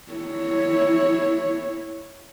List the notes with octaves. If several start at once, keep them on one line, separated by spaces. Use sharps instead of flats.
E4 C#5